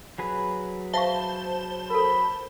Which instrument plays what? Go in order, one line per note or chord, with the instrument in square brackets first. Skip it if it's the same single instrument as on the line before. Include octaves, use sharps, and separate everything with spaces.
[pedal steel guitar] F#3 G#4 B4
[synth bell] C5 A5 G7 [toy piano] E5 F5 C#6
[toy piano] A4 A#4 [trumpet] B5